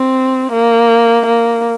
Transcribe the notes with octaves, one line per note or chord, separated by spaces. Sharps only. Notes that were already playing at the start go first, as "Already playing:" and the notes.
Already playing: C4
A#3
A#3